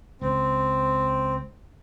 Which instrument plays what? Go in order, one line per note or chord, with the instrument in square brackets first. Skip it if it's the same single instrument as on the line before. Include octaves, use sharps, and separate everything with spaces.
[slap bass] C#2 [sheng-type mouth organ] C4